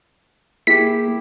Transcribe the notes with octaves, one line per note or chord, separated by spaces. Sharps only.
A#3 E4 G4 G#4 B6